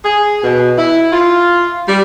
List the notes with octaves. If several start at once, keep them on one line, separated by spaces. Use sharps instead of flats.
G#4
B2
E4
F4
G3